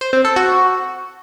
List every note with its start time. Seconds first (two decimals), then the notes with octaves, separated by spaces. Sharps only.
0.01 C5
0.13 C4
0.25 A4
0.36 F#4